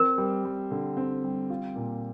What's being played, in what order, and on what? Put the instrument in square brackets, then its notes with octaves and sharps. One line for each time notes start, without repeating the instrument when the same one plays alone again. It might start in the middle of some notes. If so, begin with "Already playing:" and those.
Already playing: [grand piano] C4 [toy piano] A#4
[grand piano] G3
G3
D3
C4
G3
F4
A#2